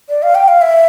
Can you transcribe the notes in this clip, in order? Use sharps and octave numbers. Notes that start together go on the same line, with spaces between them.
D5
F5
G5
F5
E5